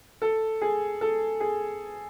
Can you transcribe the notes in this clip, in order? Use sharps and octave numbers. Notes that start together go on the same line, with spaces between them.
A4
G#4
A4
G#4